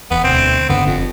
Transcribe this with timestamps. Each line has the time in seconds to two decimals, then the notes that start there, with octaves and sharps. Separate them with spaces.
0.11 E1 E2 B3
0.24 D2 B2 C4
0.69 E1 G2 D3 B3
0.87 F1 F2 C4